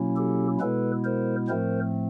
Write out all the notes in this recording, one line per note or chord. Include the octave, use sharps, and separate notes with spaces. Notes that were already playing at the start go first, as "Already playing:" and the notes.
Already playing: B2 F#3 A#3 C#4 E4
G4 A4
B2 G#3 B3 E4 A4 B4
A#4 C5
A2 F3 A3 C4 A#4 C5